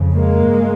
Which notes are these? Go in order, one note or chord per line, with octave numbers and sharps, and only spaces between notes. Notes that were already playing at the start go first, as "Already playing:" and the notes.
Already playing: F2 C#3
G#3 A#3
G2